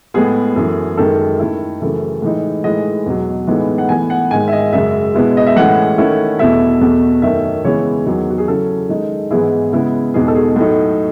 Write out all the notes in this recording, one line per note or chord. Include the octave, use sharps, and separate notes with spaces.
A2 G#3 B3 G#4
F#2 E3 A3
F#2 D#3 G#3 A4
D#3 A3 E4
F#2 C#3 E3 A3
A2 E3 G#3 D#4
A2 E3 G#3 D#4 D#5
E2 B2 F#3
A2 E3 G#3 B3 D#4
F#5
A2 E3 B3 G#5
F#5
G#2 D#3 G#3 G#5
E5
D#5
F#2 C#3 G#3 E5
B2 G#3 B3 E4
D#5
E5
A2 E3 G#3 C#4 F#5
D#3 A3 C#4 E4
E2 B2 A3 E4 E5
E2 B2 A3
F#2 D#3 A3 C#4 E5
C#3 E3 G#3 B3 C#5
E2 D#3 F#3
F#4
G#4
C#3 F#3 C#4 E4 A4
D#3 G#3 D#4
G#2 E3 G#3 B3 E4 G#4
C#3 G#3 B3 E4
E2 B2 G#3 D#4 G#4
A4
G#4
A2 F#3 A3 D#4